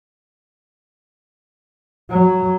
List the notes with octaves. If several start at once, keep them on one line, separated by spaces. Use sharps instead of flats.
F#3